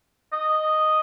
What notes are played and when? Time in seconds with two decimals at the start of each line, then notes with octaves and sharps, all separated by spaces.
0.33 D#5